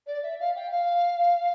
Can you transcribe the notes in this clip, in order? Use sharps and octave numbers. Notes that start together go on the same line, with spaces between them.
D5
E5
F5
G5
F5